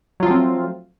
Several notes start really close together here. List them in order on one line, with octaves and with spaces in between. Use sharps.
F#3 F4 F3 A3 C4